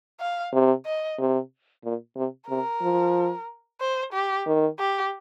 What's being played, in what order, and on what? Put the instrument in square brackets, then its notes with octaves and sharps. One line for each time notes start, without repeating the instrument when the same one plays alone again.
[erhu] F5
[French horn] C3
[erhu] D#5
[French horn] C3
A#2
C3
[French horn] C3 [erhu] A#4
[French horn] F3
[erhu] C5
G4
[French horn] D#3
[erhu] G4